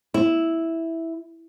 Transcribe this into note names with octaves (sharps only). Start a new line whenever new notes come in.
E4